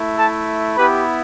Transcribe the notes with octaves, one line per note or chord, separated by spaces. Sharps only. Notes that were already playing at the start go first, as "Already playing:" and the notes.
Already playing: A3 E4
A4 A5
B3 E4 G4 B4 B5